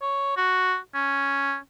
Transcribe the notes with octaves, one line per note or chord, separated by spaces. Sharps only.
C#5
F#4
C#4